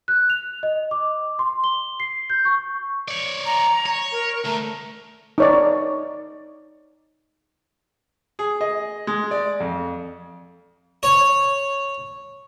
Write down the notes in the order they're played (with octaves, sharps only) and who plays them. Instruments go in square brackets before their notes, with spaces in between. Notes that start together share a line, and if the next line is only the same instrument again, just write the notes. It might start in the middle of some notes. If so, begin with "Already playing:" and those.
[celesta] F#6
F7
D#5
D6
C6
G7
C7
G6
C#6
[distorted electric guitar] C#5 D5
[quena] A#5
[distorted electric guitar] C#5
[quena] A#4
[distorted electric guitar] D2 A3 [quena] A#5
[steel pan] D#4 C#5 D5
[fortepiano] G#4
D#5
G#3
D5
F2
[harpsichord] C#5